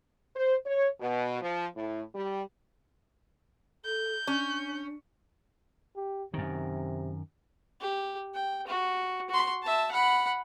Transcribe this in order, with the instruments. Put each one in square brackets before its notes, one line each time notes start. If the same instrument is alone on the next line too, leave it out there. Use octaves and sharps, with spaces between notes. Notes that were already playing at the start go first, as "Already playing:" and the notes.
[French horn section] C5
C#5
B2
F3
A2
G3
[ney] A4 [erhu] G6
[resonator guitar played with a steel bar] C#4 [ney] D4
[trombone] G4
[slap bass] F#2 D#3 [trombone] C3
[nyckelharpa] G4
G5
F#4
F#4 C6
E5 A5
F#5 B5